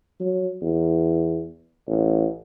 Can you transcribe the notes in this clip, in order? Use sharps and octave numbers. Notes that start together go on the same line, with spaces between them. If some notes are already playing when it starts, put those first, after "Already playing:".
F#3
E2
A1